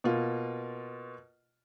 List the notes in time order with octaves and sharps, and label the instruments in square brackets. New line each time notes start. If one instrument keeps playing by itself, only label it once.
[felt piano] B2 A#3 F4